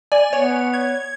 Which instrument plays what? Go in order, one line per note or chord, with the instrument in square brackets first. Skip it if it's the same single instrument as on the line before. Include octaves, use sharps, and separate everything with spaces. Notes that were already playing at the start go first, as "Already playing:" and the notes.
[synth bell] D5 G#5
[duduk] B3 [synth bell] C#5
[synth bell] G#6